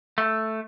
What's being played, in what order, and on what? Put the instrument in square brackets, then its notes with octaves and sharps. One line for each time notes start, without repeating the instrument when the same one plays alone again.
[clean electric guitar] A3